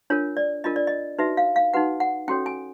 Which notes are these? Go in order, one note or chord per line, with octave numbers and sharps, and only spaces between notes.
D4 F4 A#4 C#5
D5
D4 F4 A#4 D#5
D5
D#5
D#4 F#4 B4 E5
F5
F5
D#4 F#4 B4 F#5
F#5
C#4 F#4 A4 C#5 G5
G#5